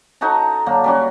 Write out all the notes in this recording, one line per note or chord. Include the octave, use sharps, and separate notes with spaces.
D#4 F#4 A4 A#5
D3 F#3 A#3
G3 C#4 F#4